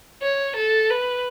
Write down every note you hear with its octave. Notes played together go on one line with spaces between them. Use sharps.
C#5
A4
B4